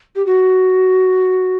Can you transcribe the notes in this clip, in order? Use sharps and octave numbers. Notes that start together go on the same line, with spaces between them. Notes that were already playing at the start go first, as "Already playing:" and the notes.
G4
F#4